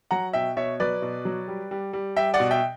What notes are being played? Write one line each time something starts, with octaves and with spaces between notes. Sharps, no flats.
F#3 F#5 A#5
B2 E5 G5
B2 C#5 E5
F#3 B4 D5
B2
F#3
G3
G3
G3
G3 E5 G5
D5 F#5
B2
E5 G5